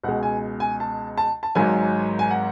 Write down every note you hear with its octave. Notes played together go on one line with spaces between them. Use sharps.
C#2 B2 G#3 F#5
G#5
G#5
A5
A5
A5
G#1 G#2 F#3 G#5
G#5
F#5